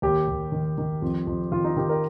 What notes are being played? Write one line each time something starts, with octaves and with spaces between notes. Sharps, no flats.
D#2 G4
D#2
D#3
D#3
F2
F2
D#3 F4
D#4
D#3 G4
A#4